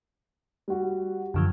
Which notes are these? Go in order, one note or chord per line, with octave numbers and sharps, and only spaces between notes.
G3 F#4
F#2 D3 F3